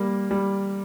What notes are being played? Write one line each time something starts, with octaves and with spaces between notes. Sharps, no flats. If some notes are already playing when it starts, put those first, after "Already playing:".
Already playing: G3 A#3
G3